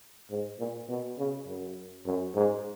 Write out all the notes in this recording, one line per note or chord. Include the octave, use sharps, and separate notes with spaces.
G#2
A#2
B2
C#3
F#2
F#2
G#2